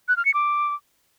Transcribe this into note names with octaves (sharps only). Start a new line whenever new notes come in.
F#6
F6
C#7
D6